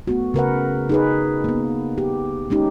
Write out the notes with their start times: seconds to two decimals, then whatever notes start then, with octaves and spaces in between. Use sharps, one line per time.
0.08 A3 B3 F#4
0.34 C#3 A#4 B4 F#5
0.89 D#4 G#4 B4
1.44 A#3 B3
1.98 G4
2.50 G#3 C#4 D#4 G4